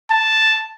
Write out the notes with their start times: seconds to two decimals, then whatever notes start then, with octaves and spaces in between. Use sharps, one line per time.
0.11 A5